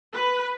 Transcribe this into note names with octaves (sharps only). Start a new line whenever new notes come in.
B4